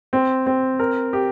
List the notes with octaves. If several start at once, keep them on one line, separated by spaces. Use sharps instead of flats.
C4
C4
A#4
G4